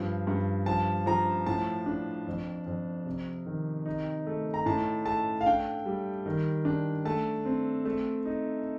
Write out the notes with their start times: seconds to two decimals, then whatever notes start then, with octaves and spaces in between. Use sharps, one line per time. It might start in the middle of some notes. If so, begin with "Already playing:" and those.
Already playing: G2 F3
0.27 G2
0.66 F3 A5
1.06 F3 A#5
1.46 A2 A5
1.86 D4
2.27 F2
2.66 F2
3.06 C3
3.46 D#3
3.86 D#4
4.27 A3
4.54 A#5
4.66 A2 A5
5.05 A3 A5
5.41 F5
5.46 D4 G5
5.86 G3
6.26 D#3
6.65 D4
7.05 A3 A5
7.45 C4
7.85 A3
8.25 D#4